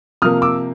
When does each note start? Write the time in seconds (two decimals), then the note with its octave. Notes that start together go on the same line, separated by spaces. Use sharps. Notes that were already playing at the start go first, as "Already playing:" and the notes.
0.22 C3 F3 A#3 D#6 F6
0.42 D6 E6